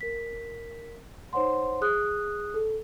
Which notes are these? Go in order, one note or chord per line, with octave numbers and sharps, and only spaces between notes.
A#4 B6
D#4 C5 C#5 F#5 C6
G#4 D#6 F#6
A4